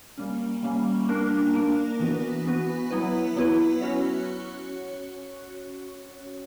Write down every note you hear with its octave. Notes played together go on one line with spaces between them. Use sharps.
G3 A#3 C#4
G3 A#3 C#4
A#3 D4 A#4
A#3 D4 A#4
E3 B3 F#4 B4
E3 B3 F#4 B4
F#3 B3 E4 B4
F#3 B3 E4 B4
C#4 F#4 C#5